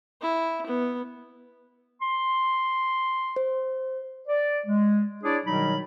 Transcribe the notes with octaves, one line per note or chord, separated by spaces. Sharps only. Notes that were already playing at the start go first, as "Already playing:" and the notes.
E4
B3
C6
C5
D5
G#3
D4 E4 G#4 C#5 D5
B2 D#3 F#3 G3 D#4 B5